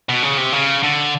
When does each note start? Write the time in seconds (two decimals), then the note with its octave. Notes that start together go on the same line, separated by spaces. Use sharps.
0.09 B2
0.23 C#3
0.38 C3
0.53 C#3
0.83 D3